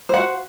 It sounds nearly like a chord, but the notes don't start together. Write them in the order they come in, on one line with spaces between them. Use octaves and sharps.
C5 F#5 F#4